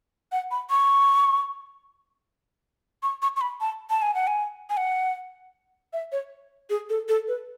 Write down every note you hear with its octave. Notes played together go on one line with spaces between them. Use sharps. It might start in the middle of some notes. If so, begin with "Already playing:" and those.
F#5
B5
C#6
C#6
C#6
C#6
B5
A5
A5
G#5
F#5
G#5
G#5
F#5
E5
C#5
G#4
A4
A4
B4